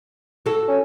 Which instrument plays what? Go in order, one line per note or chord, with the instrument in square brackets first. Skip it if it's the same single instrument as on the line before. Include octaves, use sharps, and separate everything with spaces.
[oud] F#4 A4
[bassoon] C#4